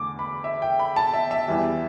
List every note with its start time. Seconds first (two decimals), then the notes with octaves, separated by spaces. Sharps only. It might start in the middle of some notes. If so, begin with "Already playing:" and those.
Already playing: E2 D3 A3 D6
0.19 B5
0.44 E5
0.62 G5
0.79 B5
0.96 A5
1.14 E5
1.31 E5
1.48 E2 E3 G3